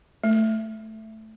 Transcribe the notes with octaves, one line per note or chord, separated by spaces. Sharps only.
A3